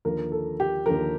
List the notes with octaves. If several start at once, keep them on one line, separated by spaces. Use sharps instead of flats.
D#2 D3 F3 A#4
A4
G4
D#2 D3 F3 A#4